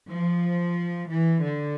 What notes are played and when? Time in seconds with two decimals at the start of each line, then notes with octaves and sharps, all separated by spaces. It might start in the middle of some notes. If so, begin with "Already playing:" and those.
0.10 F3
1.10 E3
1.44 D3